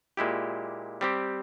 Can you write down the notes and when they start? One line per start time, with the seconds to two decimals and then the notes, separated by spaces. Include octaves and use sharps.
0.17 A#2 G#3 E4 G4
1.01 G3 C4 G4